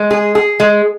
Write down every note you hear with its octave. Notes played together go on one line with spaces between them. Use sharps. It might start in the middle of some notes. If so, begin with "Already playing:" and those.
Already playing: G#3
G#4
G#4
G#3